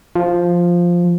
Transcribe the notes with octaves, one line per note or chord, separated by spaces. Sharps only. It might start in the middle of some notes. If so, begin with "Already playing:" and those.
F3